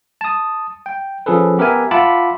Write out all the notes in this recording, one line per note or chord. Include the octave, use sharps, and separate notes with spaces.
A5 D#6
G5
F3 C#4 G#4 A4 B4
B3 G4 A#4 B4 E5 G#5
F4 E5 F#5 A5 B5 D6